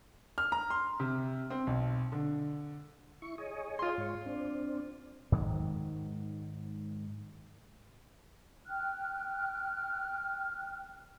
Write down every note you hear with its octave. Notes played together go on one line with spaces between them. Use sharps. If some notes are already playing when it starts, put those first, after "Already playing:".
F6
A#5
C6
C3
C4
B1
D3
E4 C#6
G#4 C#5 D#5
F4 C6
G#2 C#5
C4 D4
G#2 D#3 F#3 G#3
G5 F6 F#6